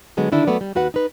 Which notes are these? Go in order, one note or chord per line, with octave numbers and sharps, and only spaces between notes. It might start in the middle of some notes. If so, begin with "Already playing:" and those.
D3 F#3 G#3 B3
D3 D#3 D4 E4 A4
F#3 A3 B3 D5
G3
D#2 F#4 B4 F#5
D#4 B4